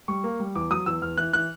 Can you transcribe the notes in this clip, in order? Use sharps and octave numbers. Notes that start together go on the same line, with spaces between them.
G3 C#6
A#3
G3
E2 D6
F#3 D#6
E2 E6
E2 F6
E3 F#6
E3 F#6